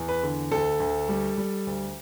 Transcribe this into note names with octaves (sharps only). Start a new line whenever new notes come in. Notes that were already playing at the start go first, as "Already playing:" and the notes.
Already playing: E2
B4
D3
D2 A4
D2
G3
G3
D2